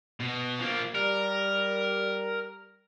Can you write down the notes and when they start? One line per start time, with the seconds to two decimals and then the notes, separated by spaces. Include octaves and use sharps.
0.20 B2
0.59 F3 A#3
0.95 G3 A#4